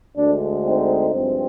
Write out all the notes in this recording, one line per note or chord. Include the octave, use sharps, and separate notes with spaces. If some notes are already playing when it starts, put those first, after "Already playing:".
D2 D3 G#3 D4
C4 D#4
G2 F3 G#3 C4